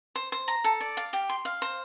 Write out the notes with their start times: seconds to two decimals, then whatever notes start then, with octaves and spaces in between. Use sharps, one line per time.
0.16 C5
0.32 C5
0.48 A#5
0.64 A4
0.81 D5
0.97 F5
1.13 G4
1.29 C6
1.45 F5
1.62 C5